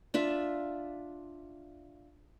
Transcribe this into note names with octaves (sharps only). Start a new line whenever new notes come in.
D4 F4 E5